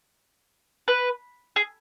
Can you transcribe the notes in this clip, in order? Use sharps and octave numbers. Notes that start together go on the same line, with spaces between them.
B4
G#4